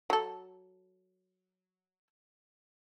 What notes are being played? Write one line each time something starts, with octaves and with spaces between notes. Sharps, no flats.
F#3 A4